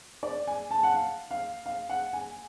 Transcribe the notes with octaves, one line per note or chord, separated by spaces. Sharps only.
D5
G#5
A5
F#5
F5
F5
F5
F#5
G#5